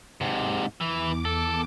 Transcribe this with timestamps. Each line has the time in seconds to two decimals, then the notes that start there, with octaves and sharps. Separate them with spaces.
0.21 G#2 C3
0.81 E2 E3 D6
1.25 A4